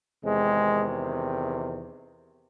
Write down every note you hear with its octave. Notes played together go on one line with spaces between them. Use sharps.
E2 C3 D#3 G#3